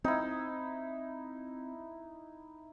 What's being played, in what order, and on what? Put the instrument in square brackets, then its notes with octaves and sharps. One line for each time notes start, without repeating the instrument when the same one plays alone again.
[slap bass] C4 [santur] D#4 E4